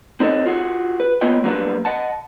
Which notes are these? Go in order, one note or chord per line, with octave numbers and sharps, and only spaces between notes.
C4 D#4 A4 C#5 D#5
F4 F#4 G#4
B4
A#3 B3 F4 C#5 D#5 G5
F#3 G3 A#3 D4 B4 F5
D#5 F#5 A5